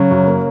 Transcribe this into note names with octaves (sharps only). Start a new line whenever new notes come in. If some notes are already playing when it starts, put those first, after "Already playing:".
Already playing: C#3 F#3
F#2
A#3